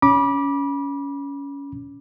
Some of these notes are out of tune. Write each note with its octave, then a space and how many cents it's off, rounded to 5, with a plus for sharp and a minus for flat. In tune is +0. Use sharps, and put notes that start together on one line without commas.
C#4 +20 B5 -30 D6 +0